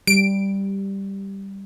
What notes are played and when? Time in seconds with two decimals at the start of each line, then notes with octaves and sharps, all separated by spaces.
0.07 G3 D7